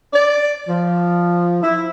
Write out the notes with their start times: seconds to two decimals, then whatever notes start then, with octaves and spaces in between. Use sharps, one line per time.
0.14 D5
0.69 F3
1.63 E4